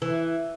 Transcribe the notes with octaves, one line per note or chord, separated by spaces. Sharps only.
E3